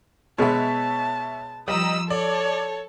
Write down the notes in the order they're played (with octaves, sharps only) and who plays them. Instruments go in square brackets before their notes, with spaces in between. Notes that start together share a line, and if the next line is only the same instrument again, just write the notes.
[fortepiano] B2 G#3 B3 [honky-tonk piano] C#5 E5 [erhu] A5
[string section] F3 E6 [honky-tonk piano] G3 D#5 A#5 [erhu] D#6
[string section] A4 [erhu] C#5 [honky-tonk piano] D5